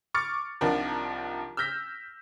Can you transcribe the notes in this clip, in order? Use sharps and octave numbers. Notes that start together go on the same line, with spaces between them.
C#6 D6 F6 A6 C#7
C2 D#3 F3 D4 A#4
E6 F6 G6 A#6 B6